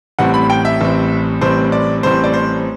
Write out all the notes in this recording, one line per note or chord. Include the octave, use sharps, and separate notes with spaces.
A1 A2 G3 C4 F#5
B5
G5
E5
A1 A2 G3 C4
A1 A2 G3 C4 C5
D5
A1 A2 G3 C4 C5
D5
C5